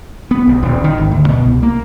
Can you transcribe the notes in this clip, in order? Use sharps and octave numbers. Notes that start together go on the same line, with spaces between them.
B3
B1
D#1
D#3
G#1
D2
B2
C2
A#3